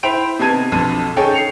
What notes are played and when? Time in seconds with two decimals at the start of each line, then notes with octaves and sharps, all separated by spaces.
0.03 E4 C5 G5 B5 D7 F7
0.39 C3 B3 D#4 A5 G#6 D#7
0.72 B1 F2 D3 A5 D#7
1.16 C#4 D#4 G#4 A4 C#5 G5
1.34 C7 C#7 F7